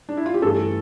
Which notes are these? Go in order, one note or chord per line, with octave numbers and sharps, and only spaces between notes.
D4
E4
F4
G4
G2 E3 A3 A4